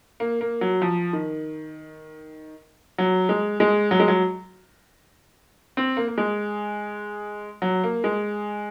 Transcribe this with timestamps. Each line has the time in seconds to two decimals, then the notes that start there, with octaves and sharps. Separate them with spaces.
0.20 A#3
0.41 A#3
0.61 F#3
0.82 F3
1.13 D#3
2.98 F#3
3.29 G#3
3.60 G#3
3.91 F#3
4.00 G#3
4.08 F#3
5.77 C4
5.97 A#3
6.08 A#3
6.18 G#3
7.62 F#3
7.84 A#3
8.04 G#3